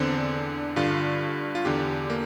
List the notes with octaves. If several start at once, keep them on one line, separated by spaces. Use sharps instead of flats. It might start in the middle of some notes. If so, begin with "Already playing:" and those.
Already playing: E2 D3 C4
G2 D3 F4
F4
E2 D3 G4
A#3